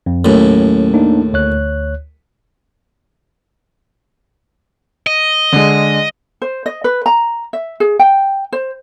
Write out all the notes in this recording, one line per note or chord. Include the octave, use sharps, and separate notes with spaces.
F2
D#2 A2 F#3 C#4
A#3 D4 D#4
D2 C#5 F#6
D#5
D3 G#3
C5
D#5
B4
A#5
E5
G#4
G5
C5